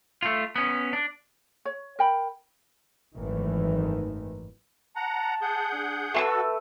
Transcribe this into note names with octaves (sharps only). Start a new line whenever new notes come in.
A3 F4
B3 C#4
D4
C#5
A#4 G5 B5
G#1 F#2 D#3 E3 A3
F#5 A5 A#5
G#4 F#5 G6
D4
A3 F#4 A4 B4 C6 E6